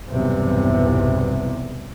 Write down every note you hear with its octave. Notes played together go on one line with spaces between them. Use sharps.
B1 E2 G2 C3 E3 B3